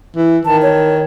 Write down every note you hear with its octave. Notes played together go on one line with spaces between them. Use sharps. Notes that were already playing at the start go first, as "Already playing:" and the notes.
E3
D#3 A5
C#5